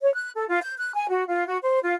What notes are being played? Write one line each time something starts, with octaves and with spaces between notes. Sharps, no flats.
C#5
F#6
A4
F4
G6
F#6
G#5
F#4
F4
F#4
C5
F4